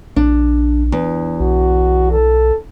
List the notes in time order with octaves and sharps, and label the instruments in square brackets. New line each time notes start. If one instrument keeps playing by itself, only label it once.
[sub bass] A#1 [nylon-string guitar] D4
[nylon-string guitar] E2
[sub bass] B1 [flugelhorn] F#4
[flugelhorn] A4